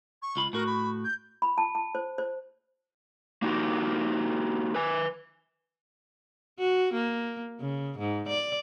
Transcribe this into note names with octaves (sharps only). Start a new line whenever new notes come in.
C#6
C#2 F4 B5
A2 F#4 A#4
B5
G6
B5
A5
A5
C5
C5
A#3 D#4 F#4 G4
B4 G#5
F#4
A#3
C#3
G#2
D5